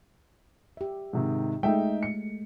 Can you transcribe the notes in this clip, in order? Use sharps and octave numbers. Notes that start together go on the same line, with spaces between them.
G4 E5
G#2 C3 D#3
G#3 A3 D#4 E5 G5
C#7